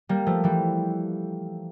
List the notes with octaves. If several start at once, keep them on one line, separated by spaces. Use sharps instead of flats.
G3 A#3
F3 A3
E3 G3